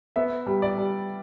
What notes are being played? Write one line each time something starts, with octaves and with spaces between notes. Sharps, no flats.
B3 E5
G3
D5
G3